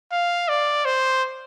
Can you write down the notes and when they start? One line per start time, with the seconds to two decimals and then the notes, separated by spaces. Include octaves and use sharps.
0.12 F5
0.48 D5
0.85 C5